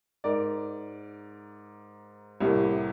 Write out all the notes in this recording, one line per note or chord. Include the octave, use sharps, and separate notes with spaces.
G#2 A#4 D5
C2 A2 C3 A#3